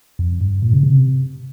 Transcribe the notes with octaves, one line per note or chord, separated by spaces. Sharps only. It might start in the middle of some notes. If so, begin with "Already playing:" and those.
F2
G2
A#2
C#3
C3